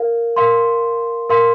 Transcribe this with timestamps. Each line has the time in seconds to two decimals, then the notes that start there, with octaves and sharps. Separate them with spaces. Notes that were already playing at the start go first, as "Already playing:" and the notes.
Already playing: A#4 F5
0.36 A#4 F5 C6
1.30 A#4 F5 C6